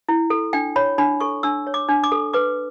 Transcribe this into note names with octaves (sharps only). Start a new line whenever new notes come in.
E4
A4
D4 G5
C#5 B5
D4 B5
A4 C#6
D4 E6
C#5
D6
D4
D6
A4
B4 D6